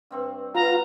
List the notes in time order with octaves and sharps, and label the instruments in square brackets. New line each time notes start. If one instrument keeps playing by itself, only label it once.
[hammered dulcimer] G2 C4 C#6
[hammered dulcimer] B3 [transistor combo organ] F4 [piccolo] A#5